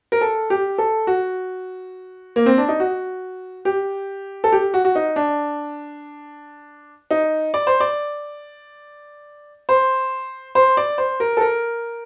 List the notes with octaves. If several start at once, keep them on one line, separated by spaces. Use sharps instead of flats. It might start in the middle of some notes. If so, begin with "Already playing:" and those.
A#4
A4
G4
A4
F#4
A#3
C4
D4
D#4
F#4
G4
A4
G4
F#4
F#4
D#4
D4
D#4
D5
C5
D5
C5
C5
D5
C5
A#4
A4
A#4